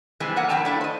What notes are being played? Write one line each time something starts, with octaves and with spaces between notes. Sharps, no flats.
C3 E3 G3 G#3 C4
A3 A#3 F#5
F2 A2 F#3 C4 G5 A5
A3 D4 E4
C5 D#5